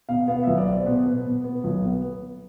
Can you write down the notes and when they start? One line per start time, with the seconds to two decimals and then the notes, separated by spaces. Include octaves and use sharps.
0.09 B2 F5
0.28 B3 F5
0.44 B1 E5
0.58 D5
0.67 B3
0.72 C5
0.86 B2 B4
1.05 B2
1.26 B2
1.44 B3
1.64 B1
1.83 B3